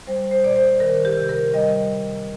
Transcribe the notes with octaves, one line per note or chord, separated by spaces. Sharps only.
G3 C5
C5
A#2 D5
C5
D#3 A#4
G4
C3
A#4
G3 D#5